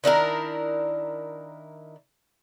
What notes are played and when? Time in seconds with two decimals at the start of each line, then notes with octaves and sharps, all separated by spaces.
0.04 D#3 D4 E4 A#4